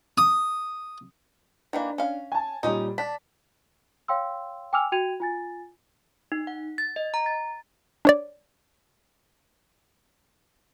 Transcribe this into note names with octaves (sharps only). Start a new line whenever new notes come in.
D#6
D#3 E3 A#3 D4
C#4 F5
G#5 A5
A#2 G3 C#4 D#4
D4 B6
C#5 F5 G5 C6 E6
G5 G#5 D6 E6 F6 F7
F#4 G5 G#6 D#7 F7
F4 G#5 A6
D#4
F#5
A6
D#5
A#5
A6
D4 C#5 D5